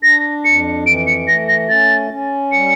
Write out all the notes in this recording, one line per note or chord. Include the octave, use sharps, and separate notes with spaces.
D4 A#6
F2 C#7
E3 D7
C#7
A3 A#6
A#6
C#4 A6
C#4
G3 C#7